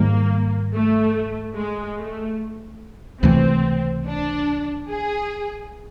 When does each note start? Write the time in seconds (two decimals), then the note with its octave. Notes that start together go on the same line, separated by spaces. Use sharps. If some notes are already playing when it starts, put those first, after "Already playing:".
Already playing: G#2 D#3 G3 A#3
0.74 A3
1.56 G#3
1.98 A3
3.22 C#2 C3 E3 A3 C4
4.06 D4
4.88 G#4